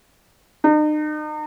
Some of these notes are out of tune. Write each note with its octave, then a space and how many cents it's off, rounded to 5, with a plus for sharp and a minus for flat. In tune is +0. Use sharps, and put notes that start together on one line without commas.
D#4 -40